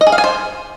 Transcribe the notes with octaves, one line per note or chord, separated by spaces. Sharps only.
D#5
G#4
F5
G#5
C5